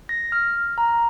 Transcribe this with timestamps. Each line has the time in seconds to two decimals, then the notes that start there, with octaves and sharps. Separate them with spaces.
0.09 A#6
0.32 F6
0.78 A#5